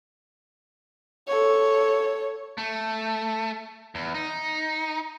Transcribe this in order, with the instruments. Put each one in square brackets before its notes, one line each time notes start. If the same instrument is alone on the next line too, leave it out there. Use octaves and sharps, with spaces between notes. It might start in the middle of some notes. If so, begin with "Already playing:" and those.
[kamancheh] A4 C#5
[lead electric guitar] A3
E2
D#4